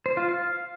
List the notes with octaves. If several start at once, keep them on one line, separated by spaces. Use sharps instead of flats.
C5
F4
F5